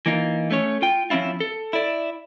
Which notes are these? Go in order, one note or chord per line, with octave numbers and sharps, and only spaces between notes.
E3 A#3 D#4 F4
A3 C#4 C#5
F4 G5
F3 C4 C#4 E4 F4
A4
E4 D5